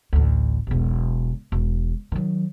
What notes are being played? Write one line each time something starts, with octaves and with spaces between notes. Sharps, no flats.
A1 D2
E1 B1
E1
D#3 F#3